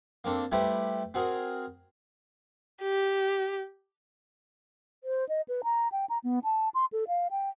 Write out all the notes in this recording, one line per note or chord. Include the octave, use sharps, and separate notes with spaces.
A#3 C4 D4 A4
G3 A3 E4 G4 B4 C5
C4 F#4 G#4 A#4
G4
C5
D#5
B4
A#5
G5
A#5
B3
A5
C6
A4
F5
G5